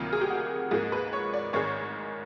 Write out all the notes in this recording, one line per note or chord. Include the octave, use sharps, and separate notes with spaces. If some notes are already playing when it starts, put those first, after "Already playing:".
Already playing: D2 C3 D#3 F#3 A#3 F4
G#4
G4
F#4
G#2 F3 A#3 G#4
B4
C#5
D5
A1 G#2 D#3 G#3 C#5